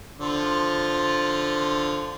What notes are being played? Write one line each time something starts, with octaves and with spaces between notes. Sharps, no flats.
D3 F3 F4